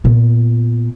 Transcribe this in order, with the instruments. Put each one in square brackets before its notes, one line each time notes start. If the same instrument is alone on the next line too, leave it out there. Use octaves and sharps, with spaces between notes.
[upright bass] A#2 B3